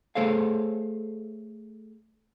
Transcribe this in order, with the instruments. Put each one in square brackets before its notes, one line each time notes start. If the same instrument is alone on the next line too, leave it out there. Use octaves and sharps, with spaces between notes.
[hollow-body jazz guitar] A3 G#4 A4 C5 C#5 F5